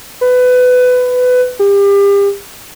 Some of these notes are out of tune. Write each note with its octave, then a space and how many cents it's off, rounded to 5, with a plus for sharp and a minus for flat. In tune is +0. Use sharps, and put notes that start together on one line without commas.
B4 +20
G4 +35